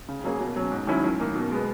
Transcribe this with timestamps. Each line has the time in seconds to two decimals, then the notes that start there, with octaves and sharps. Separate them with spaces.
0.09 C#3
0.24 F#3 A#3 C#4 G#4
0.40 B2
0.56 F#3 C#4
0.71 G#2
0.87 D#3 F#3 C#4 E4
1.04 F#2
1.20 D#3 A#3
1.35 B2
1.51 G#3 B3